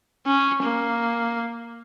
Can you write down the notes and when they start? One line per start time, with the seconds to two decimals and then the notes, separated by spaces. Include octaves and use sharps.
0.26 C#4
0.63 A#3